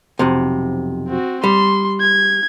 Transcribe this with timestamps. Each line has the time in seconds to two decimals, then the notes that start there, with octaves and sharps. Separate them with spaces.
0.19 B1 F2 C3
1.08 C4 F#4
1.44 G3 C6
2.01 G#6